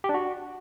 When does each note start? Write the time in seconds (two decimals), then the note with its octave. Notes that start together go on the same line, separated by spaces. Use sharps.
0.04 G4
0.09 D4
0.14 F#4